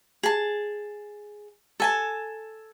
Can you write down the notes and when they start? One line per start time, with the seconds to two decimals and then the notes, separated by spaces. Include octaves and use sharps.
0.23 G#4 A5
1.80 A4 G#5 A5